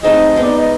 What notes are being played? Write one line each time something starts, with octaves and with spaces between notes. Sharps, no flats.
A3 C4 D#4 G#4 D#5
G#3 B3 D#4
D5
D#5